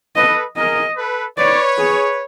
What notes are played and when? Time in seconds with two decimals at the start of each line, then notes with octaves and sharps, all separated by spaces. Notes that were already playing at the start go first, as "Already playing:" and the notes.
0.16 A4 B4 D#5
0.57 G#4 A#4 D#5
0.97 A4 B4
1.38 B4 C#5 D5
1.78 G#4